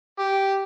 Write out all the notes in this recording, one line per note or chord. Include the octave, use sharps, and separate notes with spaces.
G4